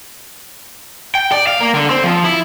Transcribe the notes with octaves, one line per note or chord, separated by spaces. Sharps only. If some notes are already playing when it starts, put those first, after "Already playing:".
G5
D5
F5
A#3
D3
C4
F3
E4